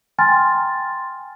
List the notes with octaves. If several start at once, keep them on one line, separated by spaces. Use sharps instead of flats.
G5 G#5 A#5 C6 F6 A6